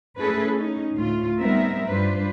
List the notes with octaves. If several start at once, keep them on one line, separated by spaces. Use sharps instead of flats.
A3 C#4 E4 G#4 A4 B4
C#4 D#4
D2 A2 A3 F4
G3 B3 C4 D#4 A#4 E5
G2 G3 D4 F4 B4 C5